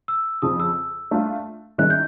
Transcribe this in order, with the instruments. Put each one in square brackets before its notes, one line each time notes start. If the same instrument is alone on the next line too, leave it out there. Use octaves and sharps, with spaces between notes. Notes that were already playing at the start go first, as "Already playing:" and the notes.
[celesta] E6
[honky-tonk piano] F2 C#3 F3 [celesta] D#6
[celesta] E6
[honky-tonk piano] A3 D4 F4
[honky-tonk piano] D#3 G#3 C#4 E4 [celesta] F#6
[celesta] G6